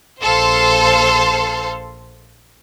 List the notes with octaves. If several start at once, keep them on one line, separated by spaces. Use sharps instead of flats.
A#1 A4 C5 F5 C6